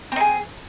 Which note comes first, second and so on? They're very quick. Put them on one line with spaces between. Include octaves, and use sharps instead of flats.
C4 D#4 G#4